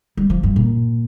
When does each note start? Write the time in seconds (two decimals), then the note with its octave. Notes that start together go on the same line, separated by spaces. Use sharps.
0.17 G3
0.30 F3
0.43 G2
0.56 A#2